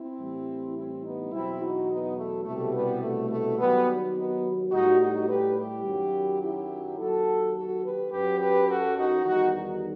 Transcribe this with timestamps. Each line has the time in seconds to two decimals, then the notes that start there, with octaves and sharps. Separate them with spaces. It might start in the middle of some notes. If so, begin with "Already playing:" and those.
Already playing: C4 E4
0.19 A2 E3 G3
0.75 C4 E4
1.04 B3 D#4
1.32 E2 B2 F#3 C4 E4
1.60 D#4 F#4
1.89 B3 D#4
2.17 A3
2.46 C2 B2 G3 A3
2.74 G3 B3
3.02 A3
3.30 A3
3.59 D#2 D#3 F#3 G3 B3
4.16 B3 D#4
4.72 A2 G3 D#4 F#4
5.00 D#4 F#4
5.28 G4 B4
5.57 E4 G4
5.85 F#2 D#3 F#3
6.42 E4 G4
6.98 D#2 D#3 F#3 F#4 A4
7.55 F#4 A4
7.83 G4 B4
8.12 F#2 F#3 G4 B4
8.39 G4 B4
8.69 F#4 A4
8.97 D#4 F#4
9.24 E2 D#3 G3 D#4 F#4
9.53 D#4 F#4